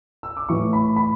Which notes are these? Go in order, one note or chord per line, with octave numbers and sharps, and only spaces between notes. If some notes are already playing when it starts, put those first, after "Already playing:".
E6
D6
A2 E3 C#6
B5
B5